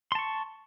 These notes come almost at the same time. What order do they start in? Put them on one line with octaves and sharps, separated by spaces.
C6 A5 C#6